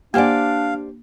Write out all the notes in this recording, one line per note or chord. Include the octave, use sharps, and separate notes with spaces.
A#3 D4 G4 C5 D5 F5 F#5 G#5